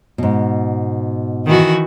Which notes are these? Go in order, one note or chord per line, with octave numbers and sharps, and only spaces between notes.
G#2 B2
D#3 E3 F#4